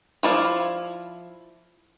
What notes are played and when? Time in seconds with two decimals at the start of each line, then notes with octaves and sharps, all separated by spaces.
0.23 F3 E4 D5 F5